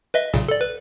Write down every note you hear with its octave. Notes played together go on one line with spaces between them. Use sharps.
B4 D#5 E5
B1 A#2 C#3
A4 D5
B4